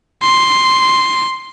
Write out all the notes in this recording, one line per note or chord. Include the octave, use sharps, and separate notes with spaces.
C6